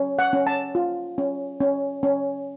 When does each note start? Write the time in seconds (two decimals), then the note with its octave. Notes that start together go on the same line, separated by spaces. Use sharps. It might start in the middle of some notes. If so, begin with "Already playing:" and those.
Already playing: C#4
0.19 F#5
0.33 C#4
0.47 A5
0.75 F4
1.18 C#4
1.61 C#4
2.03 C#4